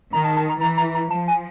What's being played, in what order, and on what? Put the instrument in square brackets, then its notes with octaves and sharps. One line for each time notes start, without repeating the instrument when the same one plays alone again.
[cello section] D#3 [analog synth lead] A#5
[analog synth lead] A5
A5
A#5
[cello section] E3 [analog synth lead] A#5
[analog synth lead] A#5
A#5
[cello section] F3 [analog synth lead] A5
[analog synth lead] G#5